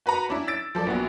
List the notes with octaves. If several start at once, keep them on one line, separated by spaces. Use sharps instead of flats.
F#4 B4 F#5 A#5
C#4 D4 E4
E6 A6 D7
F3 A4 D5
A#1 B3 F#4